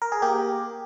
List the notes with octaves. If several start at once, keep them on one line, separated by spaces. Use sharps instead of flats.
A#4
G#4
A#3 G4